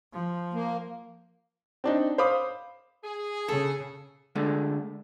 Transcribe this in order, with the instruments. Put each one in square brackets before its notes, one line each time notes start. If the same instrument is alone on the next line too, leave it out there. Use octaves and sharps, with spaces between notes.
[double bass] F3
[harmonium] A#3
[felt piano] C4 D4 D#4
C5 F5 B5 D6 D#6
[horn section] G#4
[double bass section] C#3 [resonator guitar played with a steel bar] A4
[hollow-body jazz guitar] D3 G#3 A3